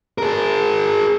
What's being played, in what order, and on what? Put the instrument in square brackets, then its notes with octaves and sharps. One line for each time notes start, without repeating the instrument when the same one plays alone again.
[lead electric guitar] G#4 A#4